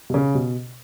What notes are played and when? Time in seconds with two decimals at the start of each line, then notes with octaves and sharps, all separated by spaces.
0.10 B2
0.14 C#3
0.35 B2